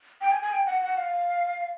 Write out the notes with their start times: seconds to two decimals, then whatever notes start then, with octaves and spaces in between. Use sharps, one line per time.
0.21 G5
0.32 G#5
0.42 G#5
0.52 G5
0.66 F#5
0.82 F#5
0.97 F5